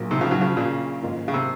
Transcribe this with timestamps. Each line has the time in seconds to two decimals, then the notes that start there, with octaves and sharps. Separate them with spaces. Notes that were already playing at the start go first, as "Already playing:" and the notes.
Already playing: A#1 A#2 F#3 A#3
0.11 C3 D#3
0.21 C#3 F3
0.31 D#3 F#3
0.41 C#3 F3
0.57 A#2 C#3
1.03 G#2 D#3 A#3 F4
1.28 C#3
1.34 C3